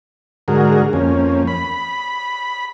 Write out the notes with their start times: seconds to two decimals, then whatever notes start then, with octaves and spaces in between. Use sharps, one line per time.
0.48 G#2 D3 F#4 G#4 A#4
0.93 F2 A#3 C#4
1.48 B5